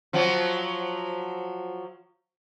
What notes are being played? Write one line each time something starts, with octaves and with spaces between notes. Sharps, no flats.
F3 F#3